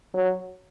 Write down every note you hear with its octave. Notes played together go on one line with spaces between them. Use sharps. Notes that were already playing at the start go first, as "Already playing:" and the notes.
F#3